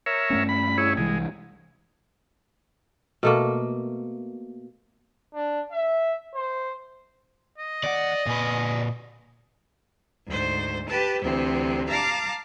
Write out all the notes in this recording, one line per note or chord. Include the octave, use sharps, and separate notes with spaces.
A#4 C#5 E5
G2 A3 C#4
B5
E4 G#4 C#5
C2 E3 G#3
B2 A3 A#3
D4
E5
C5
D#5
D#2 D5 F#5
A#2 B4 D5 G#5
D2 G#2 C5
G4 B4 A5
D2 C3 E3 C4
F5 A5 A#5 D6